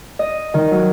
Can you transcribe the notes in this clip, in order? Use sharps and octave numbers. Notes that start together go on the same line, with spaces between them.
D#5
D#3
F#3